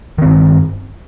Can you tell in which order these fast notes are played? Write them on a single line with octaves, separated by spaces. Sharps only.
D#3 C4 G2